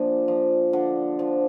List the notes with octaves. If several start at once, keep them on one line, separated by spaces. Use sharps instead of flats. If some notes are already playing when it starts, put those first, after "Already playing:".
Already playing: A#2 F3 D4
F3
D3
F3